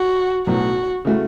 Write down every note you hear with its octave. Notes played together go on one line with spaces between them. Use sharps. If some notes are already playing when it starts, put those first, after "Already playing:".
Already playing: F#4
B1 A2 F#3 B3 F#4
C#3 E3 A3 F#4